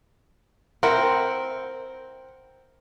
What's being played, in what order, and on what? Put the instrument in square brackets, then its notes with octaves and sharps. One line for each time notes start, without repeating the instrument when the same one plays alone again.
[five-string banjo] C4 E4 F#5 [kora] A#4